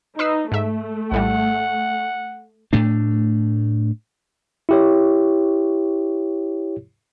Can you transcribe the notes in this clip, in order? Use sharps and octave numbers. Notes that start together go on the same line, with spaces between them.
D#4 B4 E6 C7
G#2 A3 E5
A#1 A2 G3 F#5
A2 A3 D4
E4 G4 C#5